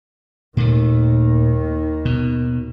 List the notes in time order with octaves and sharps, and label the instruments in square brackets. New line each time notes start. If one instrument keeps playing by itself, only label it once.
[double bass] D#2 D#3 [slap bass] A#2 A3
[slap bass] B2